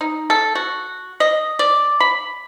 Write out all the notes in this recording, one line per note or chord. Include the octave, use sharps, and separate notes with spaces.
D#4
A4
F#4
D#5
D5
B5